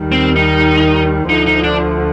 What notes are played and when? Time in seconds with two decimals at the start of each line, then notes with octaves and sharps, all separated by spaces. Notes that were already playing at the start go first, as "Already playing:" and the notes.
Already playing: D#2 D#3 G3
0.12 C4
0.36 D#4
1.28 D2 D3 F3 D#4
1.46 D#4
1.63 D4